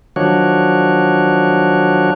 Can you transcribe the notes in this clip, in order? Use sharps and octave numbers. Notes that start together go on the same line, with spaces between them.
D#3 F3 F#3 D4 F#4 C#5